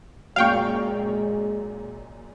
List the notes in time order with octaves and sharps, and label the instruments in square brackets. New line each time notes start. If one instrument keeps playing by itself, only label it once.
[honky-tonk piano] F#2 A#2 [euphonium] G#3 [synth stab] F5 G5 C#6